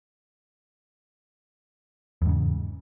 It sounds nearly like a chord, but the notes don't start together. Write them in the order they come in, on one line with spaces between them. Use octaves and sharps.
E2 G#2 C#3